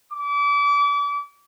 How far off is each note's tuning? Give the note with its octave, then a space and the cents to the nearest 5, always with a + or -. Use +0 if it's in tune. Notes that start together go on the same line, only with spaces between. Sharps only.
D6 -35